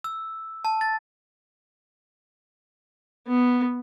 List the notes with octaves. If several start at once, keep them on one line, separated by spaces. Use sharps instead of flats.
E6
A5
A6
B3